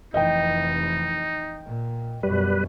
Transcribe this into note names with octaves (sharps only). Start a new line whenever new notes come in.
F1 E3 D#4 D#5 G5
A#2
F#2 B2 G3 B4